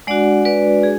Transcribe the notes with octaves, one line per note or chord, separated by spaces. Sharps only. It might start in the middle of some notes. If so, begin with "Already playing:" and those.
G#3 D4 F#4 D5 F#5
B4 D5
G#4